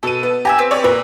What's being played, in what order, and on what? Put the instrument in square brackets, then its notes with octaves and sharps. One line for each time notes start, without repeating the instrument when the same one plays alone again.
[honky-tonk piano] B2 D#7 [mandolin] A4
[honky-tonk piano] B3
[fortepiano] G4 [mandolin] E5 G#5 A#5
[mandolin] C4 B4
[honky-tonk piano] C#5 D5 E6
[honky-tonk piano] A#2 [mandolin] A#4 [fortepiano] B4